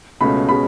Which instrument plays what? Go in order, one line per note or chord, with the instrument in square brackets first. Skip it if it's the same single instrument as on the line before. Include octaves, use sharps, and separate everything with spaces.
[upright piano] C#2 B2 A3 C#4 B5
B2 G#3 C#4 B5